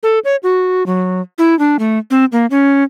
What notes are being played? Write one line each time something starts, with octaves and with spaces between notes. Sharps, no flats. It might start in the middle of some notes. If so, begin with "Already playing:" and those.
A4
C#5
F#4
F#3
E4
D4
A3
C4
A#3
C#4